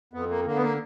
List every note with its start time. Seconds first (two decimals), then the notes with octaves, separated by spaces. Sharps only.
0.13 F2 B3
0.30 A#3
0.46 D3 A#3
0.56 B3
0.62 A#3